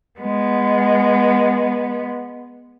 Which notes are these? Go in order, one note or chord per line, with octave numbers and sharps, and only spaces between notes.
G#3 B3